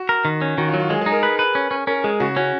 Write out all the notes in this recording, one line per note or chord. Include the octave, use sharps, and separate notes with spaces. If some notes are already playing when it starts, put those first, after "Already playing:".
Already playing: F#4
A#4
D#3
C#4
D#3 F#4
F4
F#3
F4
G#3 G#4
G#4
D#4
A#4
B4
B4
C#4
C#4
C#4 A#4
G#3 G#4
C#3 F#4
C#4 F#4